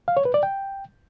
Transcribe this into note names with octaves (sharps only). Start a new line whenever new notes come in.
F5
C#5
B4
D5
G5